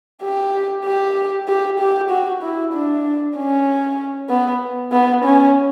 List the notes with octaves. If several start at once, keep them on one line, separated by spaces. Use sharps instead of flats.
G4
G4
G4
G4
F#4
E4
D4
C#4
B3
B3
C#4